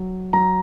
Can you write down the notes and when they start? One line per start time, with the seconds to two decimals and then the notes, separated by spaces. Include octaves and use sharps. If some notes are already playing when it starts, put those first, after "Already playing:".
Already playing: F#3
0.33 F#3 A#5